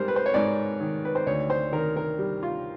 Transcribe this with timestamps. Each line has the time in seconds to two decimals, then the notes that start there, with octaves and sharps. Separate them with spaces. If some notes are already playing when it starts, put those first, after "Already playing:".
Already playing: G#2 G3 A#4 C5
0.08 B4
0.16 C5
0.26 C#5
0.34 G#2 D5
0.81 D#3
1.05 B4
1.15 C5
1.26 D2 C#5
1.50 C5
1.73 D#3 A#4
1.96 A#4
2.19 G3
2.43 F4